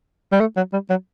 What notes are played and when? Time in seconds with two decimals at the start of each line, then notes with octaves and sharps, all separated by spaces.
0.32 G3
0.40 A3
0.56 F#3
0.73 G3
0.90 F#3